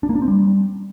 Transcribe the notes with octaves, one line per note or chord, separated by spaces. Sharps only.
D4
A#3
D4
C4
G3